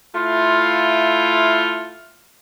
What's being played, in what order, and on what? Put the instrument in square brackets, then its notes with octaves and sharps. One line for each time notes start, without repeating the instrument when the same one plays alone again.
[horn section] A3 E4 F4